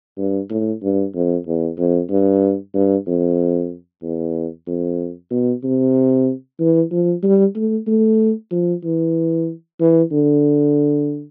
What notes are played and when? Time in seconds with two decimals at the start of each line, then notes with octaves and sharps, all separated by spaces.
0.18 G2
0.50 A2
0.83 G2
1.15 F2
1.47 E2
1.78 F2
2.11 G2
2.74 G2
3.07 F2
4.03 E2
4.67 F2
5.31 B2
5.64 C3
6.60 E3
6.92 F3
7.23 G3
7.56 A3
7.87 A3
8.52 F3
8.84 E3
9.80 E3
10.12 D3